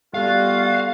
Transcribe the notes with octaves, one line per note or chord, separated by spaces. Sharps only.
G3 A3 B3 F4 F#4 F5